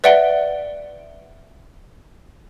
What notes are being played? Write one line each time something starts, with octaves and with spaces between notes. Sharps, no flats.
B4 D5 E5 F#5 D7 G7